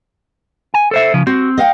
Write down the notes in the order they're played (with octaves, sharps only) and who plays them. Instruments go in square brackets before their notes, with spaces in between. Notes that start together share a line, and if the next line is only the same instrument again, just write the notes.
[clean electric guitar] G#5
A4 C5 E5
C#3 F3
[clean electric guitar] C4 [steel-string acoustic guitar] F#4
[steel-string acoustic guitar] D#5 F5 G5